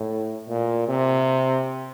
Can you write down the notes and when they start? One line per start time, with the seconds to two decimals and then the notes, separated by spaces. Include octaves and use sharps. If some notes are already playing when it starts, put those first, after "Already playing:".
Already playing: A2
0.48 A#2
0.88 C3